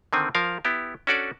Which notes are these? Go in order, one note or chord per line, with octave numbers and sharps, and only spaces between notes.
D3 D#3 C4 G#5
F3 A#4 F5
B3 E4 G4
C#4 D4 F#4 A4 D5